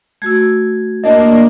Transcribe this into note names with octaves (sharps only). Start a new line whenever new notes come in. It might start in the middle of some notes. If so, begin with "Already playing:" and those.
A3 F#4 E6 G#6
E2 A#3 D4 D#5 A5